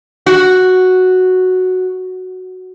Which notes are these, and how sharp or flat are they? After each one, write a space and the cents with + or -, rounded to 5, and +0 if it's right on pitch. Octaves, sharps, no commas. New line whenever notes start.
F#4 +0